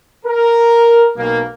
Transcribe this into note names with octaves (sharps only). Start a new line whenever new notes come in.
A#4
B1 A#3